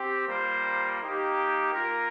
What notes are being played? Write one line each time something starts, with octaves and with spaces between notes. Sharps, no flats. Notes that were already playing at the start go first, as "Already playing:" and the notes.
Already playing: C4 G4
G3 A#3 F4 C5
A#3 D#4 G4
A#3 F4 A#4